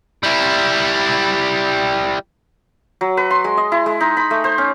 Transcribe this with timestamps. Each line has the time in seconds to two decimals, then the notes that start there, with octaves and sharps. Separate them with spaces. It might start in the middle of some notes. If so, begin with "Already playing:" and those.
0.23 G3 E4
3.01 F#3
3.17 B4
3.31 C6
3.44 G#3
3.57 D#5
3.72 E4
3.86 G#3
4.00 D#4
4.17 B5
4.31 A3
4.44 C5
4.58 C#4